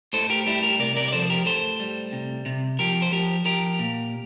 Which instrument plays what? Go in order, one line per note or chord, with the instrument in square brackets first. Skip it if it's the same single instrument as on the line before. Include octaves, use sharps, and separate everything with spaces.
[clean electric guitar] A2 A4 C5
G4 A#4
G3 E4 G4
G4 A#4
C3 A#4 D5
A#4 D5
D5
F3 A4 C5
G4 A#4
A2 A4 C5
G3
C3
C3
F3 G4 A#4
C5
F3 G4 A#4
F3 G4 A#4
A#2